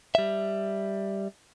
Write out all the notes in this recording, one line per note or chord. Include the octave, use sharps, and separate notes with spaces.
G3 E5